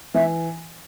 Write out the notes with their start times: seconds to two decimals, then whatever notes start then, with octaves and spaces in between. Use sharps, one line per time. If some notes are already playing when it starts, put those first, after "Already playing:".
0.14 E3 E5